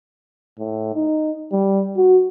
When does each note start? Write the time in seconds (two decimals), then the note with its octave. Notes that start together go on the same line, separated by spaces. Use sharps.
0.59 A2
0.94 D#4
1.52 G3
1.97 F#4